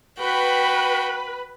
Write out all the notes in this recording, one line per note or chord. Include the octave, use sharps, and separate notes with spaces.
F#4 B4 G5 B5